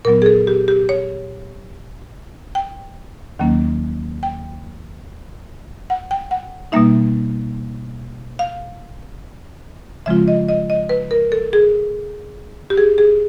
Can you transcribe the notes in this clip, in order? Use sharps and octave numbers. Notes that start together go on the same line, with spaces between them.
A#2 F#3 B3 A#4
G#4
A4
G4
G4
C#5
G5
D#2 D#3 F#3 A#3 C#4
G5
F#5
G5
F#5
B2 G3 A#3 D#4 E5
F5
C#3 F3 G#3 C4 F4 E5
D#5
D#5
D#5
B4
A#4
A4
G#4
G4
G#4
G#4